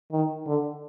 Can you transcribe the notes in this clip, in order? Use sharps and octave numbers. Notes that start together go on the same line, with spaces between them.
D#3
D3